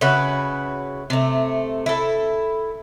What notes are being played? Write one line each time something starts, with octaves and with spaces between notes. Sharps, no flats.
C#3 E4 F#4 B4
C3 A3
E4 A4